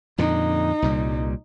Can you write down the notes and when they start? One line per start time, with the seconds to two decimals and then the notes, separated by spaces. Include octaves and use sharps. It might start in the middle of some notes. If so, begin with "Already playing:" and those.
0.18 F2 A#2 D3 D#4
0.82 C2 A#2 G3